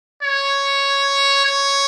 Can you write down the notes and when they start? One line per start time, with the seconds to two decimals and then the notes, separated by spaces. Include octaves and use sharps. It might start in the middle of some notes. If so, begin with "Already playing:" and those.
0.23 C#5
1.45 C#5